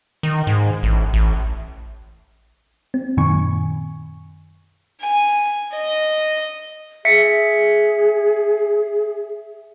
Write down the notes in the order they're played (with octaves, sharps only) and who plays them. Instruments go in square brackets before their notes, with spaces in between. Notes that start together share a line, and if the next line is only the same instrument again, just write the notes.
[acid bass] D#3
G#2
A1
A1
[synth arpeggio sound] C4
F#2 A#2 D#3 G#5 C#6
[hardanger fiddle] G#5
D#5
[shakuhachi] G#4 [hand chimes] E5 B6 C#7